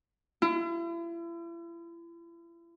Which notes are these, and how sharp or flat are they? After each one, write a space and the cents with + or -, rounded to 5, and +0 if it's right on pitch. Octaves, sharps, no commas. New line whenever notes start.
E4 +40